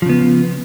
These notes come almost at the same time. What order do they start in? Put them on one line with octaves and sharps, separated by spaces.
F3 C#3 B3